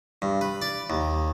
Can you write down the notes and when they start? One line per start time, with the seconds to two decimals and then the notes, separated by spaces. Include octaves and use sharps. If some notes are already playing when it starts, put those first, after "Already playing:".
0.22 G2
0.41 B4
0.62 D5
0.90 D#2